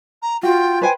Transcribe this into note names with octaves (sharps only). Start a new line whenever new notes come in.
A#5
F4 F#4 G5
B4 C5 G5 G#5